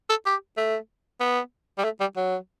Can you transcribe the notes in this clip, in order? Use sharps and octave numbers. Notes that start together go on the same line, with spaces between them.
A4
G4
A3
B3
G3
A3
G3
F#3